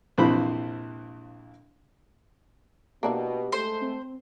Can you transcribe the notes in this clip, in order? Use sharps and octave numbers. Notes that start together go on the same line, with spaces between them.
A#1 F2 C3 E3 C5 B5
B2 A#3 D4 E4 G4
G#3 A3 A4 C5 C6
C4